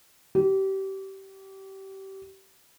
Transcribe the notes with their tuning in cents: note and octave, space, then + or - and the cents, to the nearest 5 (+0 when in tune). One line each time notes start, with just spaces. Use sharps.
G4 -25